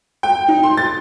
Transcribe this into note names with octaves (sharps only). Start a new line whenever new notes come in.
G5
D#4
C6
A6